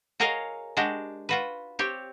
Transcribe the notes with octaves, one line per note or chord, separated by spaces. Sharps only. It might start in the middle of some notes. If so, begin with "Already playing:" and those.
F#4 G#4 A#4 C#5 D#5 F5
G#3 D4 F#4 G4
F4 F#4 B4
C4 G4 C#5